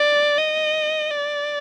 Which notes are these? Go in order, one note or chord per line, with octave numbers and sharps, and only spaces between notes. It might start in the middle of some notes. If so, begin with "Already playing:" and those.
Already playing: D5
D#5
D5